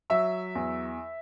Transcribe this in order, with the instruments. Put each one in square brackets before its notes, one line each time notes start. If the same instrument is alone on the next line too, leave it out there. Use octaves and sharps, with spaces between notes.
[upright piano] F#3 E5
E2